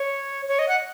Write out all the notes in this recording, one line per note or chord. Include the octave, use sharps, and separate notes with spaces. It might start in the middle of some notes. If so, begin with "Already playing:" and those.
Already playing: C#5
C#5
D#5
F#5